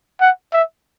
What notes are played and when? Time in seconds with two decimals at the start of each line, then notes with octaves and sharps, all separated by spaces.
0.21 F#5
0.53 E5